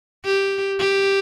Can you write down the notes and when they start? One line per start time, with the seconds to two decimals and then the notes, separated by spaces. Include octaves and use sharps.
0.25 G4
0.79 G4